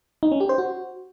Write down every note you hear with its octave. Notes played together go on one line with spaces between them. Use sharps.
D#4
C#4
G4
C5
F#4